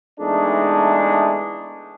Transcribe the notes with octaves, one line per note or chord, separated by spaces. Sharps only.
E2 G#3 A3 D4 D#4